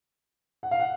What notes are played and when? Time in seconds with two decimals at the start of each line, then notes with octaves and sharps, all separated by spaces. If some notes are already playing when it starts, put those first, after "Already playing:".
0.63 F#5
0.71 F5
0.80 F#5